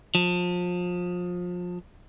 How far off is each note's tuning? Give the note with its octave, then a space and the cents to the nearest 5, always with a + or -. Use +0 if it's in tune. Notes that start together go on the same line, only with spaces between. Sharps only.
F3 +30